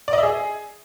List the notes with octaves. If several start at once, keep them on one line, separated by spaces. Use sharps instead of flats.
D5
D#5
E5
G#4